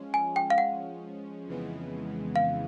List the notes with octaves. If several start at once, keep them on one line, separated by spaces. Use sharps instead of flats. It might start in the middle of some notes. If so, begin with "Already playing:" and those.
Already playing: F3 G#3 C#4
G#5
G5
F5
F#5
F2 C#3 E3 G#3 B3
F5